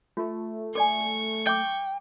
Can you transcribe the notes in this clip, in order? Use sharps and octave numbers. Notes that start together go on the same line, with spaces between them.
A3 F4
A4 D5 G#5 C#6
E5 G5 D6 D#6